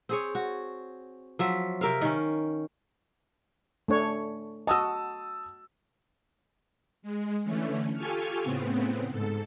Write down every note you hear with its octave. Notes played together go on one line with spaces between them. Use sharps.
C4 G#4 C#5
F#4
F3 F#3 E5
C3 A#4 E5 F5
D#3 C#4
A3 D4 C#5
F#4 D#5 A5 D#6 E6
G#3
D3 E3 A3 C#4
F4 G4 A4 G#5 C#6 F6
A2 C#3 B3 C4
G#2 A4